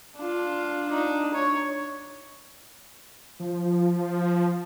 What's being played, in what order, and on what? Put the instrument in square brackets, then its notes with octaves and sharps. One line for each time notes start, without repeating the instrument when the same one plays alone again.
[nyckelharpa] D4 F4
D4 D#4
C#5
[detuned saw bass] F3